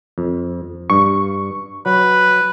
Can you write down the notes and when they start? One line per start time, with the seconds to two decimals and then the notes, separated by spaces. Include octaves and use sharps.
0.18 F2
0.90 G2 C#6
1.86 F#3 B4